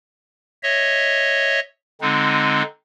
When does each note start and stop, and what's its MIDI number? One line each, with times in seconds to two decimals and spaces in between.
0.63 1.60 73
0.63 1.60 75
0.63 1.60 76
2.01 2.63 50
2.01 2.63 56
2.01 2.63 60
2.01 2.63 63